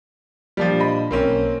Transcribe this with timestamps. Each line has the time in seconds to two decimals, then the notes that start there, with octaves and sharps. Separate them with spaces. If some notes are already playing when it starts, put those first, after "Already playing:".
0.57 A#2 F3 G3 D4
0.80 D#5 B5
1.11 B1 A#3 C4 C#4